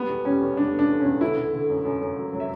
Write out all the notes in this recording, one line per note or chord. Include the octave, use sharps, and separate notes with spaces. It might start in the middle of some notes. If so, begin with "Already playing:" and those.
Already playing: G3 B3
E2
G3 C#4
E2
G3 D4
E2
D4
E2
C#4
E2
D3 E4
D3
D3
F#2
F#2
F#2
F#3
F#3
E5